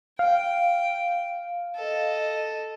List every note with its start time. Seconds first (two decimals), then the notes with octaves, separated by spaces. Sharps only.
0.19 F5 G5
1.75 A4 D#5